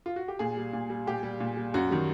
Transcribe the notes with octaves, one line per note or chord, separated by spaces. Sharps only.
F4
F#4
G4
A#2 G#4
G3
A#2
G3
A#2 G4
G3
A#2
G3
F#2 F#4
D#3 G3